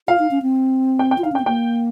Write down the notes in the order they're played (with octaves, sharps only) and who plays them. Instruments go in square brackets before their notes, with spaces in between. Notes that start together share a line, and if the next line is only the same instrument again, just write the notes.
[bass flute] F4 [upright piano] F5
[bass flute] D#4
C#4
C4
[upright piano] G5
G5
[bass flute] F4
[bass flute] D#4 [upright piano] F5
[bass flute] C#4
[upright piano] G5
[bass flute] C4
[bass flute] A#3 [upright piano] G5